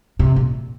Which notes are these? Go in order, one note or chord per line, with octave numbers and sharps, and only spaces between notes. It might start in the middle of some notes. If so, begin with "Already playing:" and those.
C3
A#2